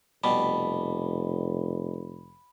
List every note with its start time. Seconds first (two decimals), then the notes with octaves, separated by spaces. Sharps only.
0.24 F1 B2 G3 B5